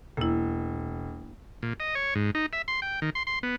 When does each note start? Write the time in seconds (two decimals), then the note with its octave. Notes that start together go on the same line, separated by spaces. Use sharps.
0.17 E1 A#3 E4
1.63 A#2
1.80 D#5
1.95 C#5
2.15 G#2
2.35 D#4
2.53 E5
2.68 C6
2.82 G5
3.02 D#3
3.15 C6
3.27 C6
3.43 B3